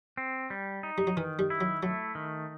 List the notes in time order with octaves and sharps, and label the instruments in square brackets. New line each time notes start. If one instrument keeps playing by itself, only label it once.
[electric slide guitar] C4
G3
D#4
[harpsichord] G3
F#3
[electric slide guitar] D#3 [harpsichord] E3
[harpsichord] G3
[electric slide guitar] E4
[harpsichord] F#3
[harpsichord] F#3 [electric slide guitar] A3
[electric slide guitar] D#3